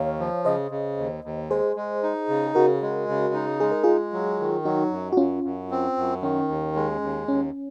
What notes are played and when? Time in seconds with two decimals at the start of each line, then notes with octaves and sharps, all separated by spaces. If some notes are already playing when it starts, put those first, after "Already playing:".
Already playing: D#2 C#5 F5
0.19 F3
0.45 C#3 C5 D#5
0.71 C#3
0.97 D#2
1.24 D#2
1.50 G#3 G#4 C5
1.76 G#3
2.03 D#4
2.29 C#3
2.47 G#4
2.55 C#3 F#4 A#4
2.82 G#3
3.08 C#3
3.34 D#4
3.60 G#3 G#4
3.72 A#4
3.84 G#3 F4 G#4
4.13 F#3
4.40 D#3
4.65 F#3 D#4 F#4
4.91 F#2
5.13 F#4
5.17 F#2 C#4 F4
5.43 F#2
5.71 C4
5.97 F#2
6.22 D#3 C#4
6.48 D#2
6.76 G#3
7.01 D#2
7.28 D#2 C#4